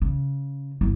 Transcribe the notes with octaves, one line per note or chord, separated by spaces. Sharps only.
C#3
G1 E4